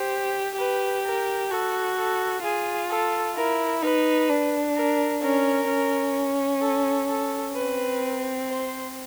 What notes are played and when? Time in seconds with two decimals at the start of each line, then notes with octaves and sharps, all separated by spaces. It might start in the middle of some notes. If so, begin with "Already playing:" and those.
Already playing: G4 C5
0.57 G4 B4
1.04 A#4
1.50 F#4 A4
1.97 A4
2.44 F4 G#4
2.90 A4
3.36 E4 A#4
3.82 D#4 B4
4.29 D4
4.76 A#4
5.22 C#4 A#4
5.69 C#4
6.62 A4
7.08 A4
7.55 C4 B4
8.48 C5